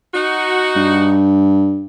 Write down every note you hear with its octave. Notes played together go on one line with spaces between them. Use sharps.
D#4 F#4
G2